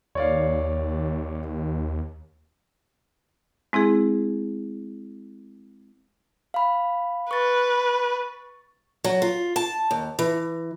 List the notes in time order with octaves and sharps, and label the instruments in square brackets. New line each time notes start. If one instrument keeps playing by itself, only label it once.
[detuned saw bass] D#2 [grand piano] C#5 D5 F5
[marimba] G#3 C4 E4 G#4
[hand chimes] F5 B5
[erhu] B4 [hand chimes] C#6 A6
[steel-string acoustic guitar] F#3
F4
A5
D#2
E3